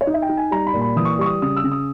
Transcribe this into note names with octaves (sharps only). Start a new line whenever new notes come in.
C#5
D#4 D#5
E5
G5
D#4
G#5
G3 A#5
B5
A#2
B5
E3 D#6
C#6
D#6
G3 C#6
D#6
C#3 D#6
E6
C#3
D#6